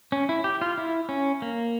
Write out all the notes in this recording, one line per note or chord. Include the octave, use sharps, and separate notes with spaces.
C#4
E4
G4
F4
E4
C#4
A#3